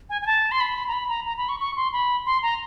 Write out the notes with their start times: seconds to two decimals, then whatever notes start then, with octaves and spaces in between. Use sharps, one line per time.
0.10 G#5
0.22 G#5
0.26 A5
0.52 C6
0.60 B5
0.88 A#5
0.93 B5
1.09 A#5
1.26 A#5
1.37 B5
1.49 C#6
1.60 C#6
1.77 C6
1.93 B5
2.26 C6
2.43 A#5